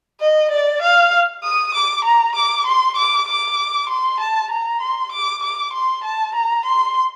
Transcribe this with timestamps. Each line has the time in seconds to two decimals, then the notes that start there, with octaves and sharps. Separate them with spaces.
0.21 D#5
0.51 D5
0.82 F5
1.44 D#6
1.75 D6
2.05 A#5
2.36 D6
2.67 C6
2.97 D6
3.28 D6
3.89 C6
4.20 A5
4.50 A#5
4.81 C6
5.12 D6
5.43 D6
5.73 C6
6.04 A5
6.35 A#5
6.65 C6